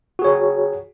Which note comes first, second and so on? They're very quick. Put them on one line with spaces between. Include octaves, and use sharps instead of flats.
F#4 G#4 C#5